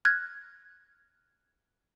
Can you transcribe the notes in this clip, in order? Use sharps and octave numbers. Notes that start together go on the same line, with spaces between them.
F6 F#6 G#6 A#6